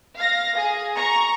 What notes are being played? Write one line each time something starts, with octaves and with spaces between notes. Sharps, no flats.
F5 A#6
G#4
A#5 C#6